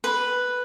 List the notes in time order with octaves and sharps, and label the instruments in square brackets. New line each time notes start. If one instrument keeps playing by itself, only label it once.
[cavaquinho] B4